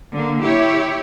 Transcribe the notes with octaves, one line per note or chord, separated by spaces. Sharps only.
D3 A#3
E4 G4 C#5